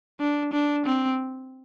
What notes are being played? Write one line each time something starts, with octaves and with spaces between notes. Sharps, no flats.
D4
D4
C4